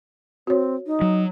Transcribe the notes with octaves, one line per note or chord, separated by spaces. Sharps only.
C4 F#4 C#5
D#4
F#3